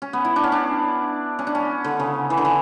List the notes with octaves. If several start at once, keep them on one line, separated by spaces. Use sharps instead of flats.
C#4
B3
E4
D4
C#4
D4
C#4
D4
C#4
D3
C#3
E3
D3
E3